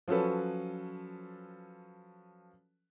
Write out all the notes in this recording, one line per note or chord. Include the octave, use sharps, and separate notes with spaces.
F3 F#3 C#4 A4 B4